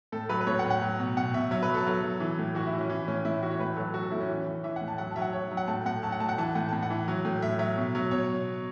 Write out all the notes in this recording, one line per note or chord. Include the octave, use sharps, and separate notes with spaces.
A2 A4
F#3 B4
B4
A2 C#5
F#5
A2
F#5
F#3
B2
B2 F#5
B2 E5
F#3 E5
B4
F#3
A4
F#3
F#3
E3
A2
E3 F#4
E4
E3
C#4
E3
A2 C#4
A2 E4
E3 F#4
C#5
A2 B4
F#3 A4
F#3 F#4
A4
A2 E4
C#4
E3
E3
E3 E5
F#5
A2
A5
F#3 F#5
A5
F#3 E5
F#5
F#3 C#5
F#3
F#5
A2 A5
A2 F#5
F#3 A5
F#5
A2 A5
F#5
E3 A5
A2 F#5
A2 A5
F#5
E3
F#3
A2
A2 E5
F#3 E5
B2
F#3
B2 C#5